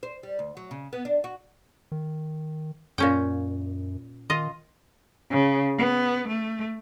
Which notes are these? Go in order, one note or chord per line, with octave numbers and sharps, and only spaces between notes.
C5
G3
D2
F#3
C#3
B3
D4
F#4
D#3
F#2 A#2 C#4 G5
D#3 F4 D#5
C#3
B3
A3